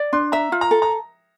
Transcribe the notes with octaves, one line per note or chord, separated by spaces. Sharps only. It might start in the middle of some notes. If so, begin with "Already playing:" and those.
Already playing: D5
D4 C6
E5 A#5
F4
A#5
A4
A#5